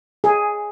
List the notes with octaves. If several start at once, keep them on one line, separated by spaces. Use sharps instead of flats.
G#4